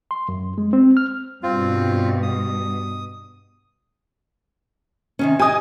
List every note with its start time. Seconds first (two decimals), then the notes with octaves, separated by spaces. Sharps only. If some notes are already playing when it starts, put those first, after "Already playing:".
0.11 C6
0.29 F#2
0.58 G#3
0.73 C4
0.97 F6
1.43 G2 B2 C4 F4
2.23 D#6
5.19 C3 D#3 C#4
5.39 G4 D#5 G#5 D#6